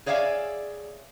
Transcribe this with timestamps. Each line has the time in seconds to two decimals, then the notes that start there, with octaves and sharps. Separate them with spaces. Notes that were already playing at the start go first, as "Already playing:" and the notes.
0.06 G#4 C#5 D5 E5 F5 G#5